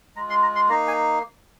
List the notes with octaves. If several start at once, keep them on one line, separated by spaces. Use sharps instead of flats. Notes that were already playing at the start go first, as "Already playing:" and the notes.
G#3 F4 A#5
C6
A#5
C6
A#3 D#4 A#5
G#5